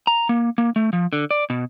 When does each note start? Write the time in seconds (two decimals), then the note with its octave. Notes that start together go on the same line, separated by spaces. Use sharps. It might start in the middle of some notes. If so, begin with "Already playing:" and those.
0.07 A#5
0.29 A#3
0.58 A#3
0.76 A3
0.93 F3
1.13 D3
1.31 D5
1.50 B2